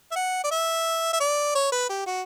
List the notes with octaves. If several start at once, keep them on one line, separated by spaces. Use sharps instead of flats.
E5
F#5
D5
E5
E5
D5
C#5
B4
G4
F#4